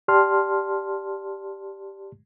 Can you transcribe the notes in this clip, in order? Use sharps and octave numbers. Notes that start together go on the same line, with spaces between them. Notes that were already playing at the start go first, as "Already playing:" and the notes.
G4 D5 A5 C6 F6